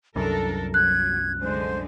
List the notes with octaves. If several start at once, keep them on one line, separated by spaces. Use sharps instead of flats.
C2 F#2 D4 A4 A#4
F#3 F#6 G#6
D3 G#3 C5